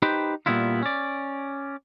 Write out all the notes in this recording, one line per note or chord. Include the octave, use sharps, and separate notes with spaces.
D#4 G4 B4 C5 G5
A#2 D#3 G3 B3 E4 F4
C#4 D5